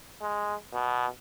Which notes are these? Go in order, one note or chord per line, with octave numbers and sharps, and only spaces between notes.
G#3
B2